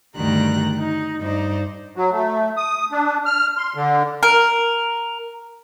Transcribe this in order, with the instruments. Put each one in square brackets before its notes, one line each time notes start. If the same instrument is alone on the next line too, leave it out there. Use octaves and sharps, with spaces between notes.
[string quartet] D2 G2 D#3 G3 A#5 F#6
D#4
G2 D#4 C5 D5
[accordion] F#3
A3
D#6
D4
F6
C6
D3
[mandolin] A#4